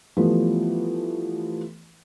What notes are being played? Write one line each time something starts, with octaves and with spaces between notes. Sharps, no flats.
E3 F3 G3 A3 B3